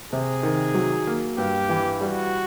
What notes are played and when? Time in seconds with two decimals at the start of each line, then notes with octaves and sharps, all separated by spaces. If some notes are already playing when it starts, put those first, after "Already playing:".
0.11 C3 G#4
0.43 D#3
0.75 F#3
1.07 A#3
1.38 G2 G4
1.69 E3
2.01 G3 F#4